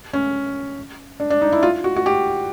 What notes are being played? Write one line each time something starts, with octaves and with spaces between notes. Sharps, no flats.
C#4
D4
D4
D#4
E4
F4
F#4
F#4
G4